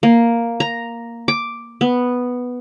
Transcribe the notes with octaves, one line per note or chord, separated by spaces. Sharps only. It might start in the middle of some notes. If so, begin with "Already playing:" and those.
A#3
A#5
D6
B3